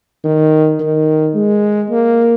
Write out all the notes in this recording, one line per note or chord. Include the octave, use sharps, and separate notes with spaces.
D#3
D#3
G#3
A#3